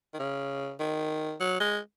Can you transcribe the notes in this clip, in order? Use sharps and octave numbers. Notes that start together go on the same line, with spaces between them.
D#3
C#3
D#3
F#3
G#3